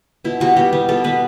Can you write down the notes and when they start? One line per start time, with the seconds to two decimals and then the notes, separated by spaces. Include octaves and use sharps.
0.25 B2 E4
0.40 G3 B3 F#4
0.57 B2 G4
0.73 G3 B3
0.88 B2 A4
1.04 G3 B3 B4